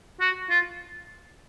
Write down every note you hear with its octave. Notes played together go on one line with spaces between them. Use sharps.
F#4
F4